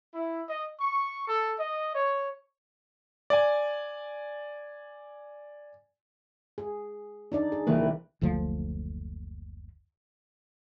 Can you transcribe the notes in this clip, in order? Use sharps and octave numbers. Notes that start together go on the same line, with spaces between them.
E4
D#5
C#6
A4
D#5
C#5
D5 G#5
G#4
D4 D#4 D5
G#4
C2 E3 A#3 B4
F#1 D2 D3 F3